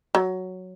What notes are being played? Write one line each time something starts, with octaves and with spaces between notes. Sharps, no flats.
F#3